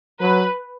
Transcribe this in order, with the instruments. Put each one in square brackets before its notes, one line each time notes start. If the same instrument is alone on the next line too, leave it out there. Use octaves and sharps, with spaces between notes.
[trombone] F#3 [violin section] B4